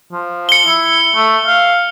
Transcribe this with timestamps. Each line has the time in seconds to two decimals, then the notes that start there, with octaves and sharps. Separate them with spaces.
0.12 F3
0.49 C#7 G7
0.66 E4
1.16 A3
1.47 F5